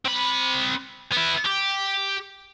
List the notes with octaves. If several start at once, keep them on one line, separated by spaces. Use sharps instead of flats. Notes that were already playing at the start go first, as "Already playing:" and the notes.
C4 B5
B3 E4
G4